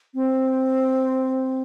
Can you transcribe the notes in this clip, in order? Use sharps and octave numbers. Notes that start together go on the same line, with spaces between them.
C4